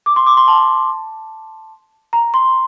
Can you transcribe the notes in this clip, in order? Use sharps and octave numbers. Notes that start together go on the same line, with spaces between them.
D6
C6
D6
C6
A5
A#5
C6